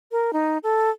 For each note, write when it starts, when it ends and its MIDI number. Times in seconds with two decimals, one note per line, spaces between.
0.12 0.31 70
0.33 0.58 63
0.63 0.90 69